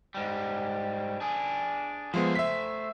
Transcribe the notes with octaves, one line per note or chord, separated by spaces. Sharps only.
G#2 G3
D4 G#4
F3 G#3 A3 B3 C5
E5 B6